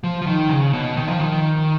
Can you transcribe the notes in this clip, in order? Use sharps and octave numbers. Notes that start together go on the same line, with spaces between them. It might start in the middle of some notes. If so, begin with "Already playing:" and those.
F3
F3
D#3
C#3
B2
D#3
F3
D#3